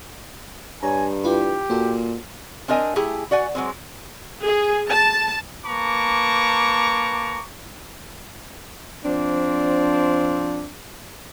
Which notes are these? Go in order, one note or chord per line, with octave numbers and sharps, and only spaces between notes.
G2 C#5 G#5 A#5
E4 F4 G4 B4
A#2 F#4 A4
C4 D4 A#4 D#5 G#5
A3 E4 G4 G#4
F#4 D5 F#5 G#5
F#3 G#3 C4
G#4
A5
A#3 B4 A5 A#5 C#6 D6
F3 C4 D4